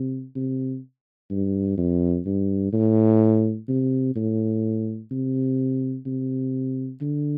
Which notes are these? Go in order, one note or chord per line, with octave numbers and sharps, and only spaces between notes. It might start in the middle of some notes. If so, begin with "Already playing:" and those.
Already playing: C3
C3
G2
F2
G2
A2
C3
A2
C3
C3
D3